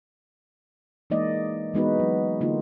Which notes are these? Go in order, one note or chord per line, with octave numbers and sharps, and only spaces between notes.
E3 G#3 A#3 D#4 D5 D#5
E3 G#3 B3 D#4 F#4 B4
F#3
D3 A#3 D#4 F4